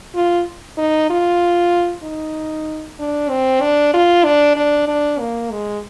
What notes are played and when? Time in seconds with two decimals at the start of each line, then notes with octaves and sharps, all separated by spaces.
0.15 F4
0.78 D#4
1.10 F4
2.03 D#4
2.99 D4
3.30 C4
3.61 D4
3.94 F4
4.24 D4
4.56 D4
4.88 D4
5.19 A#3
5.51 G#3